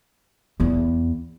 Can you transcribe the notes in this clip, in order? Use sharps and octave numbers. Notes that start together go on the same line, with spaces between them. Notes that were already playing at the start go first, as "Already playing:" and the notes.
E2 B3